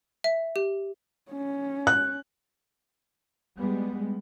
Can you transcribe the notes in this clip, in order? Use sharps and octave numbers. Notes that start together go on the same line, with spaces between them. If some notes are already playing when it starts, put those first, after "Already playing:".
E5
G4
C#4
F#6
G3 G#3 B3